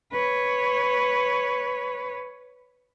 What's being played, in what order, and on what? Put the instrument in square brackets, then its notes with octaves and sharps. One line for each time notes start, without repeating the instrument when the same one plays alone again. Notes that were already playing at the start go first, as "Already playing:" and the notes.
[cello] B4 C#5